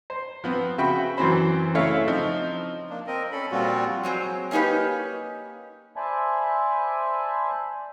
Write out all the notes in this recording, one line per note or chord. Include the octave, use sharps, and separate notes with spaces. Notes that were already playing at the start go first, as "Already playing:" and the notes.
C5
F3 B3 C4
C#3 F#4 E5 G5 B5 C#6
F#2 E3 F#3 C4 C5 B5
C#3 A3 E4 C#5 E5 F5
F3 C4 D#4
A#3 D4
C4 A#4 D#5
C#4 A4 B5
A#2 F3 G3 C4 F4 F#4
F#3 G#3 C4
A#3 C#4 D#4 G4 B4
C5 D5 E5 G#5 A5 B5